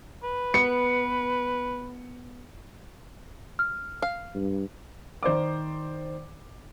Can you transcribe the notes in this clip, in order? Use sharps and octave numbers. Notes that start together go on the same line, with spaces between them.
B4
B3 C#7
F6
F5
G2
D#3 C5 D5 D6